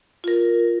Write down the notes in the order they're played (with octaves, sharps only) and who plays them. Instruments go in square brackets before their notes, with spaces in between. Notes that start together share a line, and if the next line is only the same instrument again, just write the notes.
[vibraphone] F4 A#4